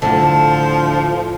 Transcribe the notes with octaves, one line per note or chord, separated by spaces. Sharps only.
D2 A2 D3 F3 F#5 A5